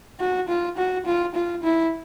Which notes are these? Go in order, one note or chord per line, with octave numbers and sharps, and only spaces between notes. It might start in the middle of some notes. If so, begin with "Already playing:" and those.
F#4
F4
F#4
F4
F4
E4